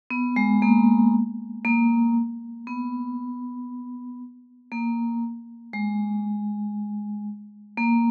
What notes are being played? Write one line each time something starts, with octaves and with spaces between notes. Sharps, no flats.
B3
G#3
A#3
A#3
B3
A#3
G#3
A#3